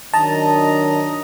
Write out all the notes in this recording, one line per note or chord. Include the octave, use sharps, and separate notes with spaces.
D#3 F#3 D4 D#5 A5 A#5